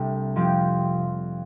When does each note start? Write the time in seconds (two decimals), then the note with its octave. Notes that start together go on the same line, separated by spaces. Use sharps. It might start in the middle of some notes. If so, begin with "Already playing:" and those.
Already playing: C2 C3 A3 D4 G4
0.36 F2 F3 C4 G4